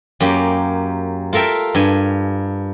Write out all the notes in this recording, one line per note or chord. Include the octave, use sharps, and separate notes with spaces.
F#2 A#3 G4
F4 A4 A#4 E5 G5
G2 G#5